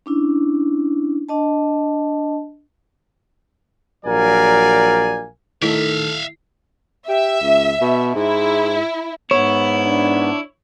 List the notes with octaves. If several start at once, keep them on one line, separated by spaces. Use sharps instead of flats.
C#4 D4 E4
D4 D#5 A5
A#1 F#3 A#4 D5 F5 G#5
D#3 A3 E4 A4 E5 F5
G4 E5
C#2
B2
G#2 E4
G#2 B3 E4 C#5
D4